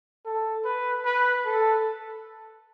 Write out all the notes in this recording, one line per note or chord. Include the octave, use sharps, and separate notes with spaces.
A4
B4
B4
A4